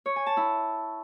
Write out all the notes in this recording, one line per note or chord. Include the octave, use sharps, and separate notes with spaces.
C#5
G#5
A5
E4